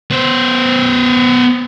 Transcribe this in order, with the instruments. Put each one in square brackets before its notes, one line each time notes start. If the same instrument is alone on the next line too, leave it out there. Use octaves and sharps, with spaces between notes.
[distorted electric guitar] B3 C5